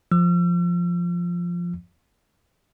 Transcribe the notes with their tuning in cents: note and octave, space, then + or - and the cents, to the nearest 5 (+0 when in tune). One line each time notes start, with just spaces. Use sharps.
F3 +0 E6 +40